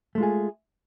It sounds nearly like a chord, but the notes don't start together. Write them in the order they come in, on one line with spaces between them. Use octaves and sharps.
A3 G#3 F4 G#4